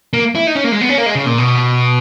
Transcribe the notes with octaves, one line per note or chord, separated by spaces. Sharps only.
A#3
E4
D#4
C#4
A#3
G#3
B3
C#4
A#3
G#3
C#3
A#2
B2